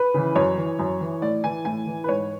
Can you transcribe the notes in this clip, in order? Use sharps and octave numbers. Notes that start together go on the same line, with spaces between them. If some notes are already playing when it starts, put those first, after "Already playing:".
Already playing: B4
C#3 E3
F#2 C#5
E3
F#2
E3
A2 D5
E3 G#5
A2 G#5
E3
B4
G#2 C#5